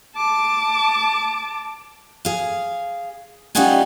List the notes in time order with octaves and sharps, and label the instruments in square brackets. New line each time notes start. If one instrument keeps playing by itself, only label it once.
[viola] A5 D6
[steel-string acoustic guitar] G#4 F5
G3 C#4 D#4 F4 F#5 G#5